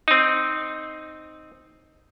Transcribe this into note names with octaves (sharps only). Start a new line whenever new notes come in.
C4 D#4